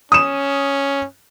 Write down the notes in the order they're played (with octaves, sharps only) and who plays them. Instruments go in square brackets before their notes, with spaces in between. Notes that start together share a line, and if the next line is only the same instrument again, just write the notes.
[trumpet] C#4 [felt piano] D#6 E7